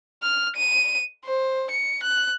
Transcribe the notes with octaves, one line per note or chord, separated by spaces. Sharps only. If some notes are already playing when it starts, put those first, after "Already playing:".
F6
D#7
C5
C#7
F#6